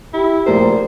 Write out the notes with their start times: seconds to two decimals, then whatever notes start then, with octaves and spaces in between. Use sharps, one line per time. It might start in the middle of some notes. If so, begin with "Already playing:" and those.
0.14 E4 G4
0.46 F1 A#1 A#4 C5